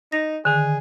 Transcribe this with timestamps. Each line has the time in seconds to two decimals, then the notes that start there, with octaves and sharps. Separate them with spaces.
0.12 D#4 A#6
0.45 D3 D#3 G#4